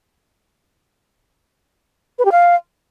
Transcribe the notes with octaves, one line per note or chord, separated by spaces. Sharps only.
B4
G4
F5